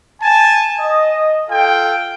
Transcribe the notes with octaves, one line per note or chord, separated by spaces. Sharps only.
G#5 A5
D#5
F4 A4 F5 G5